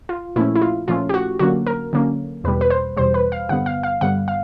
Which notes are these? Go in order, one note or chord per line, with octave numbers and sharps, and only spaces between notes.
F4
A#2 F3 A3 C#4 E4
E4
F4
A#2 F3 A3 C#4 F4
G4
F#4
D3 F#3 A#3 C#4 F#4
A#4
D3 F#3 A#3 C#4
E2 B2 G3 B4
B4
C5
E2 B2 G3 C5
B4
F5
G2 D3 G3 B3 F#5
F5
F5
G2 D3 G3 B3 F#5
F5